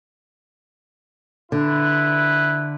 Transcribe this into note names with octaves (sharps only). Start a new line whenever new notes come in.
D3 E4 B4